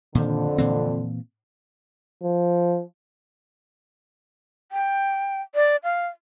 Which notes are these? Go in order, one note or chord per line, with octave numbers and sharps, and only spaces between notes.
F2 A#2 D3 D#3
A#2 E3 C4
F3
G5
D5
F5